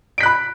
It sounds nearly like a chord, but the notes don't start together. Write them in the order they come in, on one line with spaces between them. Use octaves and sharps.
D7 B6 F#6 B5